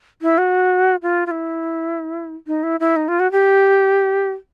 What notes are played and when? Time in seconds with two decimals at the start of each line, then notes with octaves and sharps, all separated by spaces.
0.22 E4
0.38 F#4
1.02 F4
1.26 F4
1.31 E4
2.47 D#4
2.63 E4
2.80 E4
2.96 D#4
3.08 F4
3.20 F#4
3.32 G4